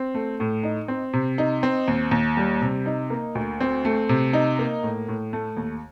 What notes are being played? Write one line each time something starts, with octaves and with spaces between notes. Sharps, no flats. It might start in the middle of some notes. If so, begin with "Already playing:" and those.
Already playing: C4
A3
A2
D#4
C4
C3
D#4
C4
D#2
D#2
G3
C3
D#4
A#3
D2
C4
A3
C3
D#4
A#3
A2
A2
A3
D#2